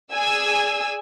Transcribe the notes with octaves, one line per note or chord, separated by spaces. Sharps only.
G#4 D5 G#5 E6